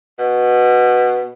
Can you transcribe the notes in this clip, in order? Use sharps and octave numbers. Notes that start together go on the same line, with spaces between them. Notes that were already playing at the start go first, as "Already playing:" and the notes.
B2